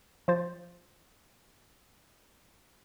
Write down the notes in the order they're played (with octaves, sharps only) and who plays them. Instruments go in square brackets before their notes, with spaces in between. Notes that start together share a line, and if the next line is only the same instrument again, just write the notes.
[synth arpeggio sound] F3 F4 C5 A6